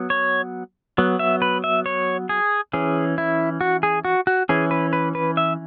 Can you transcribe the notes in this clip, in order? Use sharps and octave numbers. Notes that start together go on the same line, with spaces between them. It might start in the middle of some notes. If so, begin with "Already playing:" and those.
Already playing: F#3 B3
C#5
F#3 B3
E5
B4
E5
C#5
G#4
E3 C#4 G#4
E4
F#4
G#4
F#4
F#4
E3 C#4 G#4
B4
B4
B4
E5